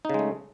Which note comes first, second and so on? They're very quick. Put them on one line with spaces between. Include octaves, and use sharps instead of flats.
D#4 C#3 G#3 A3